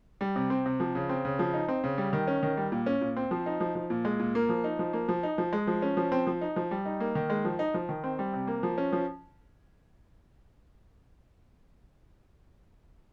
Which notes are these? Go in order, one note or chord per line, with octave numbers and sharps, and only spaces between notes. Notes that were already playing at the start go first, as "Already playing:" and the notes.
G3
C3
C4
C3
F3
C#3
C4
C#3
F3
D#4
C4
C#3
G3
D#3
C#4
D#3
G3
A#2
C#4
A#2
C4
F3
D#4
F3
F3
A#2
G#3
A#2
A#3
F3
D#4
F3
A#3
F3
D#4
F3
G#3
F3
C#4
F3
C4
F3
D#4
F3
G3
D#4
A#3
D#3
G#3
F3
D#4
F3
D#3
C4
G3
C3
A#3
F3
C#4
F3